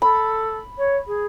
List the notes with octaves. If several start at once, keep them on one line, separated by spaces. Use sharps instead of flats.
A4 B5
C#5
G#4